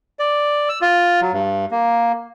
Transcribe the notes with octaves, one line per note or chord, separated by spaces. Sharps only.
D5
E6
F4
F#3
G2
A#3